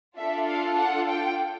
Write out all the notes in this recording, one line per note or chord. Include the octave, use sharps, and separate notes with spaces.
D4 F4 A4 E5
F5
F#5
G5